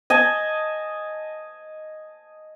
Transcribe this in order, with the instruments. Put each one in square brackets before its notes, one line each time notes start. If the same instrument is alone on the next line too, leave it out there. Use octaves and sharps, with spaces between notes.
[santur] D#5 G#5 A5